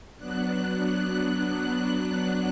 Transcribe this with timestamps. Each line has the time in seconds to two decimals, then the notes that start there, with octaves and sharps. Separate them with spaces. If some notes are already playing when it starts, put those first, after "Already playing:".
0.16 F#3 B3 D4 F#6